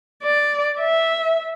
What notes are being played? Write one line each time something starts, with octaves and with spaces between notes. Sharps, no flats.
D5
E5